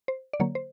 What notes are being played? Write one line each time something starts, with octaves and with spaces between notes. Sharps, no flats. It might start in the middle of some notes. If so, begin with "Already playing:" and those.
C5
D5
D3 F#3 A#3 C#5
C5